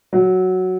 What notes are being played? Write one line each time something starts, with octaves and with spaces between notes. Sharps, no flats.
F#3